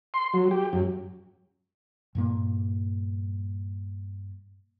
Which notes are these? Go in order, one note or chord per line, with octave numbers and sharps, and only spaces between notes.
C6
F#3
G4
F#2
G2 A#2 A#3